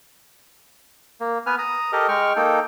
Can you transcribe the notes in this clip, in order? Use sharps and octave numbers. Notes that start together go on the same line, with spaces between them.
A#3
B3 B4 G#5 F6
A#5 D#6
G4 A4 A#4 D#5
G#3 G5 C#6 F6
A#3 D#4 A4 G5